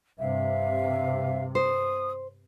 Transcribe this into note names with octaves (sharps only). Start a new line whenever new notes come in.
G2 C3 E5 F5
C5 D#6